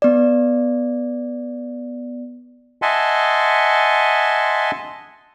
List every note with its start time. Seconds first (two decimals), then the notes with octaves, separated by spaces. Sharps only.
0.02 B3 D5
2.82 D#5 E5 F#5 G#5 A5 C6